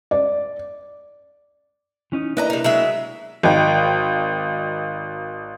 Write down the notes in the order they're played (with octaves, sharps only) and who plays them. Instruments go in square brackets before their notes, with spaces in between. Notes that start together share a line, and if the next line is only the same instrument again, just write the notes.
[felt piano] D5
[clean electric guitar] E3 C#4 D#4
[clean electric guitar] A#3 D4 E4 [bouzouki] B4 D#5 A#5
[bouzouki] C3 D#4
F#3 G#3 E5
[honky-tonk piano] G#1 D#4 G5